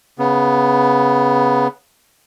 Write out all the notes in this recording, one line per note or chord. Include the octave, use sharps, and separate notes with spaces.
C#3 B3